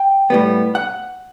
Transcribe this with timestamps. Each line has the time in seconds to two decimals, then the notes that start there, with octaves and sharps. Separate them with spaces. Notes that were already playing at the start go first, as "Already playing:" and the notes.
Already playing: G5
0.30 A2 G3 B3
0.75 F#5